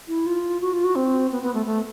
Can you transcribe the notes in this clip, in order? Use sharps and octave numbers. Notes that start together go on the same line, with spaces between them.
E4
F4
F#4
F4
F#4
C4
B3
B3
A3
A3